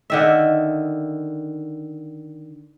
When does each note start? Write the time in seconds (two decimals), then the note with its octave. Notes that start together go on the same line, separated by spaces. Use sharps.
0.10 D3 D#3 E5